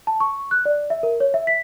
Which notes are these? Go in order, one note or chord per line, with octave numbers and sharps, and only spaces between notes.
A5
C#6
F#6
D5
E5
A#4
C#5
E5
B6